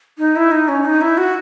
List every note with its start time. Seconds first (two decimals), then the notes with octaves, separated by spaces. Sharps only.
0.18 D#4
0.36 E4
0.52 D#4
0.68 C#4
0.85 D#4
1.01 E4
1.18 F#4